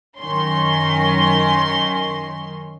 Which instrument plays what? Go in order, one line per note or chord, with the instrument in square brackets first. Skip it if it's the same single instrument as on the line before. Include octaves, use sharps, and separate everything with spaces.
[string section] F#2 D#3 C#4 C6